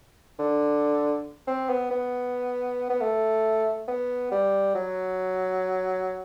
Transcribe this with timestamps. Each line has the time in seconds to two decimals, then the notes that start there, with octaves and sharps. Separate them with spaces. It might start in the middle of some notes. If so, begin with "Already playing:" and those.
0.39 D3
1.47 C4
1.70 B3
1.90 B3
2.90 B3
3.01 A3
3.88 B3
4.31 G3
4.75 F#3